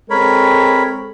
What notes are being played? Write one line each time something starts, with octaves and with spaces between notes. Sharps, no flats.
G#3 C4 A4 A#4 C#5 B5